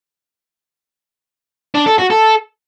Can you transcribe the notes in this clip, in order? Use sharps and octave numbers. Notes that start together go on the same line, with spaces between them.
D4
A4
F#4
A4